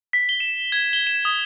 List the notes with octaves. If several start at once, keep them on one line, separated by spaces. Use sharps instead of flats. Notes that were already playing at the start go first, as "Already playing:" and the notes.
B6
G7
E7
G#6
G7
E7
D#6